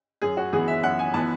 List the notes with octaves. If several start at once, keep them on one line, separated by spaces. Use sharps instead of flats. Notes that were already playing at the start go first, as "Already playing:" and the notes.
F#2 G#4
F#4
E3 B3 G#4
E5
F#2 F#5
G#5
E3 B3 A5